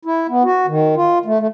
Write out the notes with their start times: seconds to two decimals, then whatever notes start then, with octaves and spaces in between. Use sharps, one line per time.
0.05 E4
0.29 B3
0.44 F#4
0.67 D#3
0.96 F4
1.26 A3
1.40 A3